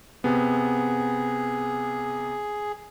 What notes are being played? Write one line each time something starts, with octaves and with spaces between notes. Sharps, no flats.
C3 B3 G#4